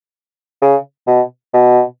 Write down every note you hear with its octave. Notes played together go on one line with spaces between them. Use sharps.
C#3
B2
B2